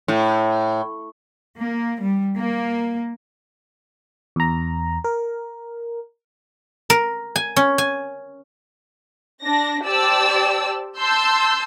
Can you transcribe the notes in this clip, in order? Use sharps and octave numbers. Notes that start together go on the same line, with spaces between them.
A2
A#3
G3
A#3
E2 A#5
A#4
A#4
G#5
C#4
G#5
D4 A#6
G4 C5 D5 A5 E6
A5 C6 E6 G6